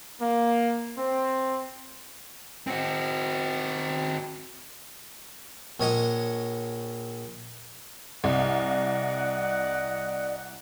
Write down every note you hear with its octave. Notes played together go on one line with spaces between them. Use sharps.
A#3
C4
C4 F#4
A#1 C#5 D#5 F#5
C2 D5 D#5 F#5